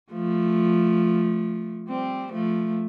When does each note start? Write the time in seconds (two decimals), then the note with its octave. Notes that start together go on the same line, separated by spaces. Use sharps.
0.12 F3 A3
1.88 G3 C4
2.33 F3 A3